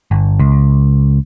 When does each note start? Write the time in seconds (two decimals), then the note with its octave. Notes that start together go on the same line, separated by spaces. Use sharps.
0.11 G1
0.40 C#2